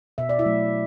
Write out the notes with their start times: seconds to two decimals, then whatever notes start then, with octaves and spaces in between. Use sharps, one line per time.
0.18 B2 E5
0.29 D5
0.39 E4 E5
0.46 F#3 A3